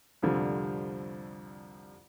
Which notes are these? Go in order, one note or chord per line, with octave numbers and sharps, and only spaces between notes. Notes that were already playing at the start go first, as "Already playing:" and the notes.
C2 F2 D3 F3 G3